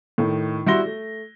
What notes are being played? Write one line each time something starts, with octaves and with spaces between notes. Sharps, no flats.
A2 D#3
G3 E4 F#4 C6 A#6 G7
A3